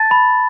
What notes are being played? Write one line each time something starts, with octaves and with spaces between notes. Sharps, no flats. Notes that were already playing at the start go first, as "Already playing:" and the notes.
Already playing: A5 A6
B5